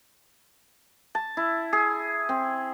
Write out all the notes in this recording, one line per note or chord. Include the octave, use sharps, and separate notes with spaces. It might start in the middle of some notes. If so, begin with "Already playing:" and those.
A5
E4
G#4
C4